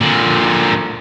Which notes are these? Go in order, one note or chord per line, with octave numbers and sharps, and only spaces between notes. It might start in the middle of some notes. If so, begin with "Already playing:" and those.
A#2 D3